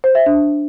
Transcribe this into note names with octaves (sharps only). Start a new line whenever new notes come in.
C5
E5
D4